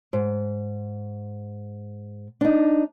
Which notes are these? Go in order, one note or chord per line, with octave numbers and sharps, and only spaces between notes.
G#2
D4 D#4